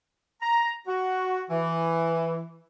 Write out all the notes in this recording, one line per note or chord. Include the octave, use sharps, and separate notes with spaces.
A#5
F#4
E3